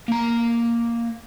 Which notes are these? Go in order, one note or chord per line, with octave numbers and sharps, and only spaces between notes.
A#3 A#5